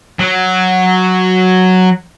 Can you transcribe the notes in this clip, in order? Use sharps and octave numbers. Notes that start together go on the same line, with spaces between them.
F#3